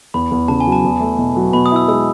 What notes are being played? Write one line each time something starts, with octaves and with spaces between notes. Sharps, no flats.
E2 B5
E2
C#3 A5
G#5
F#3
A5
E2
A3
B2
F#3
B2 B5
D#6
E4 E6
G#3 E6